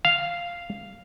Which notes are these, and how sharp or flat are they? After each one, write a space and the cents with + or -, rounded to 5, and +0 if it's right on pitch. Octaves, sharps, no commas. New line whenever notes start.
F5 -5